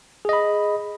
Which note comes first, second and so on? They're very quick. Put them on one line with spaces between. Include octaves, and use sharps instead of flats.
G#4 D#5 B5